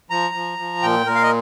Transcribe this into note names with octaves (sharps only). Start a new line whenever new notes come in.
F3 A#5
F3
F3
A#2 G5
A#2 A#4
F5
D#5